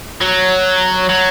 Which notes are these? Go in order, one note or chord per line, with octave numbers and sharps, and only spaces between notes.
F#3
F#3